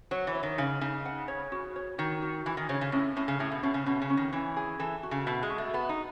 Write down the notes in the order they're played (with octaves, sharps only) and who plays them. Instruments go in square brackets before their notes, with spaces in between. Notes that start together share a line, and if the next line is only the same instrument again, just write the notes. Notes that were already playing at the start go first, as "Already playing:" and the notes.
[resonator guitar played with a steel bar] F#3 [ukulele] C#5
[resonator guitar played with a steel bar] E3
[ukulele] C#5
[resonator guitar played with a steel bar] D#3
[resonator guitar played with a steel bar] C#3 [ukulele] D#4
[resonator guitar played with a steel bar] C#3 [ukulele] D#4
[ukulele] F#5
C#5
F#4
C#5
[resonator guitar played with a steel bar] D#3 [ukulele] F#4
[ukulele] F#4
[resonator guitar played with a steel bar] E3 [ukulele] G#5
[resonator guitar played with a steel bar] D#3
[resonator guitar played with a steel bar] C#3 [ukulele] C#5
[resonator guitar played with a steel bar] C#3
[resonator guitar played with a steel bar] A2 [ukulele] C#4
[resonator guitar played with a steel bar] A2 [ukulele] C#4
[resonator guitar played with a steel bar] C#3
[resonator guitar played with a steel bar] A2 [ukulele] G#4
[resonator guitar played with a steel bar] B2
[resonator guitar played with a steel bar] B2 [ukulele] C#4
[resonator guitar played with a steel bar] C#3
[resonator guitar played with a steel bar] B2 [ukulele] C#4
[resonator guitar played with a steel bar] C#3
[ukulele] C#4
[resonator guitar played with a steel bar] D#3
[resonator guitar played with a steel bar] E3 [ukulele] C#4
[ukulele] G#4
[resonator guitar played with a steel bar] E3 [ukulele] A4
[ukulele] F#4
[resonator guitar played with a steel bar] C#3
[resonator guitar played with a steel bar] B2 [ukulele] E5
[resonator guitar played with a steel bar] G#3
[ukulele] F#4
[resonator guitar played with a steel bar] A3
[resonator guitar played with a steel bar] B3 [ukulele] A4
[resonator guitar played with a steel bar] D#4